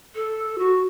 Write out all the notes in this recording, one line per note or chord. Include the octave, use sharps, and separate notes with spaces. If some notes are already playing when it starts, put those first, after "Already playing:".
A4
F#4